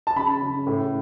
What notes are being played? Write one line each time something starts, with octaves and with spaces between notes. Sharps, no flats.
A5
C#3 B5
C#3
A2